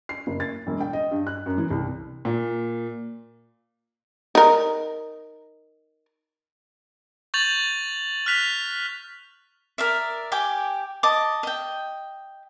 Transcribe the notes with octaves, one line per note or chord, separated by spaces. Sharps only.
C7
F#1
A6
E1
G5
D#5
G2
F#6
F#2
E3
C2
A#2
D#4 A#4
C#6 G6 A6 F7 F#7
F6 F#6 B6 F7
A#4 D5 E5
G4 G5 G#5 D6
D#5 A5 D6
D#5 G5